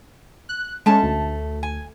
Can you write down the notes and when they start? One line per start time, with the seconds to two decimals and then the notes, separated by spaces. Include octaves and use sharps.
0.49 F#6
0.86 G#3 A3 C#4 A5
1.02 D2
1.63 G#5